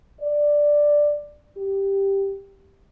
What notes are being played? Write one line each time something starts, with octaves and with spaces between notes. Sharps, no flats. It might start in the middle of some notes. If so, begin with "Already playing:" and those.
D5
G4